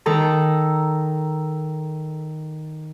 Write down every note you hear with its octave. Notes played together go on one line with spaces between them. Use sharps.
D#3 A4 A#5